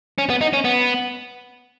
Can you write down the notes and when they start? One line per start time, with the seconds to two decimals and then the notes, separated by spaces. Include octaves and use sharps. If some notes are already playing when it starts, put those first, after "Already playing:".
0.18 C#4
0.30 B3
0.41 D#4
0.53 C#4
0.65 B3